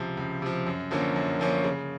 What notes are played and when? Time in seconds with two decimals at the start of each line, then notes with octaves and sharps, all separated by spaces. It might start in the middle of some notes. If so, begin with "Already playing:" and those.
Already playing: C#2 C3 F3
0.17 C#2
0.42 C3 F3
0.66 F#2
0.91 D3 F3 A#3 C#4
1.16 F#2
1.39 D3 F3 A#3 C#4
1.64 C#3